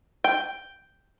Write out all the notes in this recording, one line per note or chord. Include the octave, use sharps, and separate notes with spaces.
G5